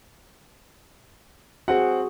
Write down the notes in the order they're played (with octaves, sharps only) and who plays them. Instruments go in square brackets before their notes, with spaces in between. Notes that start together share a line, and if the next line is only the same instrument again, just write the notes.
[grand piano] C4 F#5 [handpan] F#4 G#4